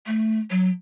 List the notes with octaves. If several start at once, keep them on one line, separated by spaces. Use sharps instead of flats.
A3
F#3